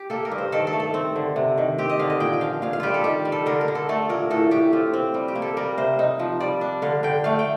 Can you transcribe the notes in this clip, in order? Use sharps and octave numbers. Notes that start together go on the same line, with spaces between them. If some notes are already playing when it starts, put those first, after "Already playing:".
Already playing: G4
A#3 A4
A#4
G2
C5
D#3 A4
A4
A3
A4
C4
D3
C3
D#3
C4 G4
D#5
D3 F5
D#5
A#2 G5
G5
F3 F5
A#2 F5
F5
G3 F4 G4
A4
D#3 G4
G3
A4
D3 A#4
A#4
D3
A4
A3 A4
A#2 A#4
A2 A4
A2 G4
C4 F4
C4
G3
G4
A#3
A4
G3 A#4
C3 C5
D#4
F3
G3 D5
D4
D3 F5
D3 G5
A3 F5
G5